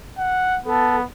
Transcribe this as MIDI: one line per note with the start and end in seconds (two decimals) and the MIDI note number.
0.18 0.59 78
0.66 1.03 59
0.66 0.95 69